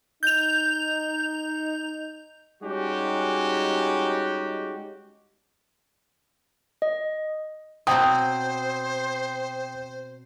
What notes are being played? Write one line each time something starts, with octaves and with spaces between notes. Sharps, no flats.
D#4 G6 F7
G3 G#3 C#4 D#4 F#4 G4
D#5
B2 F#3 C4 C5 G5 D#6